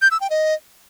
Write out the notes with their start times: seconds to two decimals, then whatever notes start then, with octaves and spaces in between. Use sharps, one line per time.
0.02 G6
0.11 E6
0.21 G5
0.30 D#5